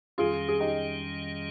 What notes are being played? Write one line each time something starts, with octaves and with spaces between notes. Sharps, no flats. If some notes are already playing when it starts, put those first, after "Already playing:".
F2 D#3 G3 C#4 F4 G#4
G#4
D#4 G4